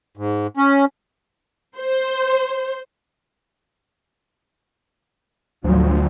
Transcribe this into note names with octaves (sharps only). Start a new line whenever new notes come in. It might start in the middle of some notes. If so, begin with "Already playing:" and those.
G#2
C#4
C5
A1 D2 F3 F#3